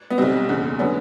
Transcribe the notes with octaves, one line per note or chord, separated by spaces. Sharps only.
B3
B1 B2 G3 C4
F#1 E2 C#3
D3 F#3 B3 C#4